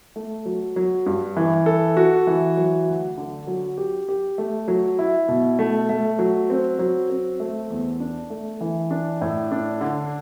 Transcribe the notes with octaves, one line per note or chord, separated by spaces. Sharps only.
A3
F#3
F#3
G2
E3
A4
F#4
E3
F#3
D2
D3
F#3
G4
G4
A3
F#3
E4
B2
A3
A3
F#3
C4
F#3
C4
A3
E2
D4
A3
E3
D4
A2
D4
D3